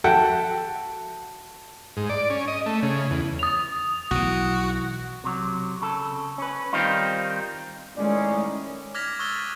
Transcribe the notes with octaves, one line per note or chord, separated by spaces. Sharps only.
F#4 A4 E5 F#5 G5
G#2
D5
C#4
D#5
A3
C#3
E2
D#6 F7
B1 E3 F#4
C3 F#3
C#3 A4
C#4 B4
D#3 G3 C4 D#4 F4
A2 D#3 G#3 C#4 D5
D6 F6 G#6 A#6 B6 F7
C#6 D#6 E6 F#6 A6 G7